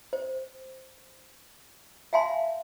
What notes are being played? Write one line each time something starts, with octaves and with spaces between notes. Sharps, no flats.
C5
E5 F5 G#5 A5 C6